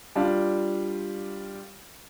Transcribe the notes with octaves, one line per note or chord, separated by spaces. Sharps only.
G3 D4 F4